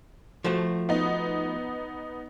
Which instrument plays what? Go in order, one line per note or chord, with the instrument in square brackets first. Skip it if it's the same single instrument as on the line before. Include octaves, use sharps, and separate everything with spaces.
[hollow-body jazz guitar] F3 A3 F#4
[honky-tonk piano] B3 D#4